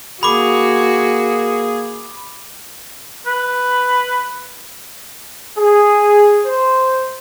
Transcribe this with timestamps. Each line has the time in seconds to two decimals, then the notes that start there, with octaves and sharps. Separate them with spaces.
0.23 A#3 F#4 G#4 B5 D6
3.27 B4
5.56 G#4
6.46 C5